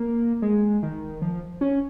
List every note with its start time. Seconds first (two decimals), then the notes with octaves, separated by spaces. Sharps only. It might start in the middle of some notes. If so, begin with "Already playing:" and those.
Already playing: A#3
0.42 G#3
0.83 D#3
1.22 F3
1.61 C#4